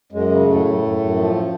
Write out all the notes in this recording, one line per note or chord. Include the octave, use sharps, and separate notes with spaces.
F#2 G#3
C#3
F#2 A2 A3
F#2
F#2
F#2
F3